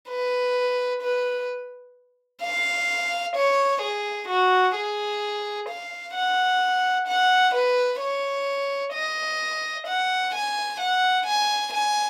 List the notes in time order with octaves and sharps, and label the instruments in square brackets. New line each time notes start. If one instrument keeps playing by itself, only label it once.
[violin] B4
B4
F5
C#5
G#4
F#4
G#4
F5
F#5
F#5
B4
C#5
D#5
F#5
G#5
F#5
G#5
G#5